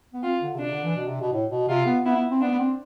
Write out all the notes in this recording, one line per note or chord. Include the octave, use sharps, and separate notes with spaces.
B3
C4 F4
D3
C3
B2 D4
C3
D3
E3
B2
C3
B2
A2
B2
C3 F4
B3
B3 E4
B3
C4
B3 D4
B3
C4